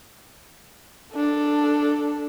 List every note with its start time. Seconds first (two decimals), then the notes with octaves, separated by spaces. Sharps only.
1.14 D4 A4